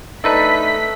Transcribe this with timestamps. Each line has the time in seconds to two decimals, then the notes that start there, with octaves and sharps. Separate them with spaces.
0.24 A3 D4 D#4 B4 E6 B6